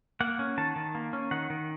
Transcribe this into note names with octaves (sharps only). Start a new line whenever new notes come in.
A#3 F#5
C#4
D#3 A5
D#3
A#3
C#4
D#3 F#5
D#3